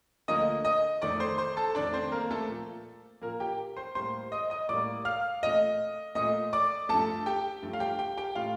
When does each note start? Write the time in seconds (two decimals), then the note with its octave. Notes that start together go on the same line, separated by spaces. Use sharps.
0.28 D2 D3 F3 A#3 D#5 D#6
0.65 D#5 D#6
1.02 F2 D#3 A3 D5 D6
1.20 C5 C6
1.38 C5 C6
1.57 A4 A5
1.75 F2 D#3 A3 D4 D5
1.93 C4 C5
2.12 A#3 A#4
2.31 A3 A4
2.48 A#2 F3 A#3
3.22 A#2 F3 A#3 A#4
3.40 G4 G5
3.77 C5 C6
3.95 A2 G3 A#3 C5 C6
4.32 D#5 D#6
4.50 D#5 D#6
4.69 A2 G3 A#3 D5 D6
5.05 F5 F6
5.43 A#2 A3 D#5 D#6
6.15 A#2 A3 D#5 D#6
6.53 D5 D6
6.89 G2 F3 A3 A4 A5
7.26 G4 G5
7.62 G2 F3 A3
7.73 F5
7.80 G4 G5
7.99 G4 G5
8.17 G4 G5
8.35 A2 A3 F4 F5